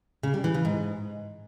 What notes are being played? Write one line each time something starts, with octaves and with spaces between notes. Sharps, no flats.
C#3
G3
E3
C#3
G#2